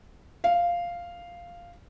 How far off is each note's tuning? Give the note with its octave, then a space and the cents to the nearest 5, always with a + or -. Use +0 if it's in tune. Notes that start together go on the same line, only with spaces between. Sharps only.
F5 -5